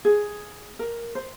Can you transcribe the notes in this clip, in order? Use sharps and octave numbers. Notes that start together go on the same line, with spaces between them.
G#4
A#4
C5